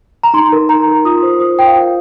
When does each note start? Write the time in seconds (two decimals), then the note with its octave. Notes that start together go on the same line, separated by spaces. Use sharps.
0.23 A#5
0.34 D#4 C6
0.52 A#4
0.69 D#4 A#5
0.87 A#4
1.05 F4 D#6
1.23 C5
1.40 F4 D#6
1.59 C5 G5
1.67 F5
1.76 F4